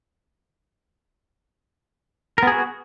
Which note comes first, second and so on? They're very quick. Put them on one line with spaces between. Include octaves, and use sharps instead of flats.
A#4 B3 G#4 F#4